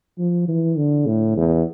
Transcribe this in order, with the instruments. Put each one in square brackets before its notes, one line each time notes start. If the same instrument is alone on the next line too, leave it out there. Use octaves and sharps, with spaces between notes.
[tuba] F3
E3
D3
A2
E2